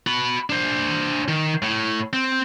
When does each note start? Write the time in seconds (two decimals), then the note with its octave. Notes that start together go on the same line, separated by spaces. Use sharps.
0.07 F#4 B5
0.50 D4 C5
1.28 D#3
1.62 A2
2.13 C4